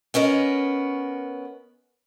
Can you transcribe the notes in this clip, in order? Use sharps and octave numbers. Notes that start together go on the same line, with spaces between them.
B3 C#4 A#4 D#5